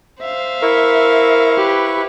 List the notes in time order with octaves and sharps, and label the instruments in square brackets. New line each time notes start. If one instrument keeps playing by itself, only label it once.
[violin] C5 F5 [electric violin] E5
[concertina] E4 C#6 [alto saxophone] A#4
[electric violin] G4 B4